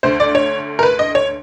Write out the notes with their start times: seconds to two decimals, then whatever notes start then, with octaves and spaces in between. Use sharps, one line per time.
0.03 D2 D3 C5
0.20 D5
0.35 C#5
0.79 A#4
0.83 B4
0.99 D#5
1.15 C#5